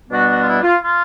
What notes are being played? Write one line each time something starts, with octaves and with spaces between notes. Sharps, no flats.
B2 G3 B3 D4 F#4
F#4
F4
E4
F4
F4